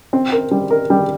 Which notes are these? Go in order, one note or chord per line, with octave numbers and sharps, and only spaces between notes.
C4
A#4
G3
A#4
G3